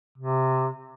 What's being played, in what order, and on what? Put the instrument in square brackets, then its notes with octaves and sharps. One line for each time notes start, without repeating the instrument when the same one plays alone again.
[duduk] C3